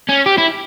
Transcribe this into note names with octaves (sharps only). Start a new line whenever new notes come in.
C#4
G4
E4